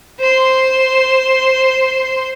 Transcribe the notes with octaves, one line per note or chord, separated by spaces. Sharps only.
C5 C6